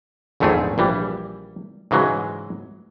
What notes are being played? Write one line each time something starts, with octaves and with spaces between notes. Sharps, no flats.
A#1 E2 G#2 A3 C4 G#4
A#1 E3 G3
G#2 C#3 E3 F#3 G#3